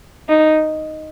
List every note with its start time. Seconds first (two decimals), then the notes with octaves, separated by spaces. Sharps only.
0.29 D#4